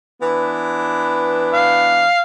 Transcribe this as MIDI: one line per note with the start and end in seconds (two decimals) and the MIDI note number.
0.21 2.06 52
0.21 2.06 59
0.21 2.06 62
1.53 2.22 77